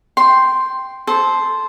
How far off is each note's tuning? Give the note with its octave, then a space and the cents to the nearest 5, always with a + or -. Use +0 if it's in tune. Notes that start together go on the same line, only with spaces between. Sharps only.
G5 +0 C6 +0
A4 -15 C5 +0